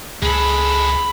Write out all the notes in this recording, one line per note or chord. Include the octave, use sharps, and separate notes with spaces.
C#2 G#3 G#4 A4 B5